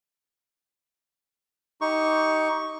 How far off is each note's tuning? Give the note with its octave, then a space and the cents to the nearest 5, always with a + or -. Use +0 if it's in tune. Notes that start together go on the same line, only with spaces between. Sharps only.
D#4 +15 G4 -10 C#6 +0